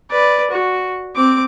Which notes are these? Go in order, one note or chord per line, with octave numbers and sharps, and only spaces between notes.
B4 D5
F#4
C4 D6